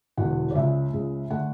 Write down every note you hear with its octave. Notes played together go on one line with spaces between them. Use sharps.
E1 E2 D3 F#5
D5
C#2 C#3 G#3 E5
C#2 C#3 G#3
D3 A3 F#5